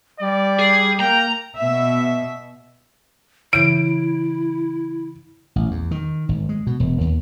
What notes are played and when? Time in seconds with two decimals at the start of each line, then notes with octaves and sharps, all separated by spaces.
0.20 G3 D5
0.59 G#4
1.00 A#3 G5 A#5
1.56 B2 E5
3.53 C#3 E3 E4 D7
5.56 A1
5.71 E2
5.91 D#3
6.29 G#1
6.49 G#3
6.67 B2
6.80 E1
7.01 D#2